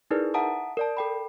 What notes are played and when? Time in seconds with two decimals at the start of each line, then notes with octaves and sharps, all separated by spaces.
0.11 D#4 E4 G#4 A#4 B4 D5
0.34 E5 F#5 A5 A#5 D#6
0.77 A#4 D5 A5
0.97 A4 G5 B5